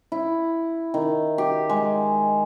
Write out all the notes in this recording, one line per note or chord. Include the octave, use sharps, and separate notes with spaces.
E4
D#3
G4
G#3